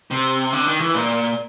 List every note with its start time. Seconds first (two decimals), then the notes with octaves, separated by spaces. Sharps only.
0.11 C3
0.53 D3
0.66 D#3
0.80 E3
0.94 A#2